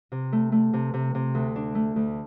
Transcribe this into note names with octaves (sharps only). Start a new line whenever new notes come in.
C3
A3
A3
C3
C3
C3
D2
D4
A3
D2